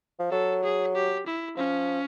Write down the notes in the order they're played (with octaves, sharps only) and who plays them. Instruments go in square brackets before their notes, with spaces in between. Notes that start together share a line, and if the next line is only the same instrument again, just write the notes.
[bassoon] F3
[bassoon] F#3 [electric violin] A4
[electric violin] G#4
G4
E4
[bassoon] F3 [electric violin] C#4